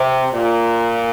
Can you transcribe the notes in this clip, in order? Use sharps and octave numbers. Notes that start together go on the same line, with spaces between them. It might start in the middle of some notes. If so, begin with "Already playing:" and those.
Already playing: C3
A#2